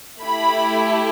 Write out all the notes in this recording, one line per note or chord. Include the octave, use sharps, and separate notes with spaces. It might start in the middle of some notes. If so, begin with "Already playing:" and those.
A3 E4 G4 B5